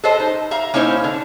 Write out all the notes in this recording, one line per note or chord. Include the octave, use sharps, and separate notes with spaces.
A4 B4 C5 D#5 A5
D#4
E5 F5 A#5
A#3 C#4 D#4 E4 C5
D3